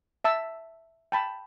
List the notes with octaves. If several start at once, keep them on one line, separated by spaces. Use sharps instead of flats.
E5 A5 E6
G5 A5 B5